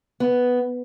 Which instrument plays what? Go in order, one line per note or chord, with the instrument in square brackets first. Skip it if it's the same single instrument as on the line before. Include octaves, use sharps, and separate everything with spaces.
[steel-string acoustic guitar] B3